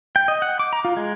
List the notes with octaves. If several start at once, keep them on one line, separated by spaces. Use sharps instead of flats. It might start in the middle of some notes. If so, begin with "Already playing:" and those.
G5
D#5
F#5
D6
A#5
F4
G#3